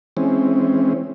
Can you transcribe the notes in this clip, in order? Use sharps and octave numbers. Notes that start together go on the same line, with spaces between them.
E3 G#3 C4 C#4